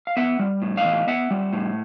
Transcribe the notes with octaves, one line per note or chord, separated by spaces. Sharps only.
F5
B3 E5 F#5
G3
A2
D#5 F5
E3
B3 E5 F#5
G3
A2